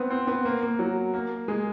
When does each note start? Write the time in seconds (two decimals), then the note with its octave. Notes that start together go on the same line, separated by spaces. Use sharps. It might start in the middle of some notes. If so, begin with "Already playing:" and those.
Already playing: B3 C4
0.10 C4
0.27 B3
0.45 A#3
0.63 A#3
0.79 F#3
1.14 A#3
1.48 G#3